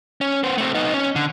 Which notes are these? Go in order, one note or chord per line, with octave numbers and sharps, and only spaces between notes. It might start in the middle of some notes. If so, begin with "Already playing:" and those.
C#4
B3 C5
A3 C4
B3 D#4
C#4
D3